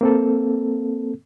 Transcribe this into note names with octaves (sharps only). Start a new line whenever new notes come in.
A#3 C4 A4